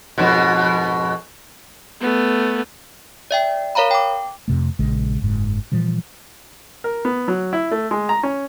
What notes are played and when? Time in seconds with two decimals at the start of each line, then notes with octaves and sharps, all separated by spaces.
0.18 F2 G#2 B2
2.01 A3 B3
3.31 D5 E5 G5
3.75 A#4 C#5 F5 A#5 B5
3.91 G5 D6
4.48 F2 C3 A3
4.79 A#1 C#3 G#3
5.22 F#1 G#2
5.72 A#2 E3 F3 G3
6.84 A#4
7.05 B3
7.28 F#3
7.53 E4
7.71 A3
7.91 G#3
8.09 A#5
8.23 C#4